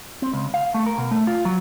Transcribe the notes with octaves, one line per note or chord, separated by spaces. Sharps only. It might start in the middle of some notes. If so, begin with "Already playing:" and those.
C4
C#2
F5
A3
A#4
B2
A3
F4
F#3